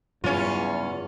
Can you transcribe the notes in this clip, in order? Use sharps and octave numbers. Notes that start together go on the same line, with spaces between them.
E2 G2 C#3 F#3 C#4 F4